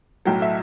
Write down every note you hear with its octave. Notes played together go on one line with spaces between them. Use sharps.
B1 A2 F#3 G5
E5